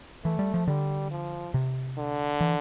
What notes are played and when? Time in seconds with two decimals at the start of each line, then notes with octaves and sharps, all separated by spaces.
0.25 E3 A3
0.39 G3
0.54 F3
0.67 D3 G3
1.11 F3
1.54 C3
1.98 D3
2.41 E3